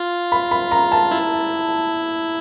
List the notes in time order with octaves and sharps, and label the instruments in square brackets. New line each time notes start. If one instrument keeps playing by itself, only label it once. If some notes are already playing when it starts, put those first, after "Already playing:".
Already playing: [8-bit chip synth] F4
[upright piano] B5
B5
A#5
A5
[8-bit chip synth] E4